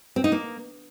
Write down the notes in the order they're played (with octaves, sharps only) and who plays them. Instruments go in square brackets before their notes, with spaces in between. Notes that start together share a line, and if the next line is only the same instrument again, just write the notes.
[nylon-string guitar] C4
D#4
A#3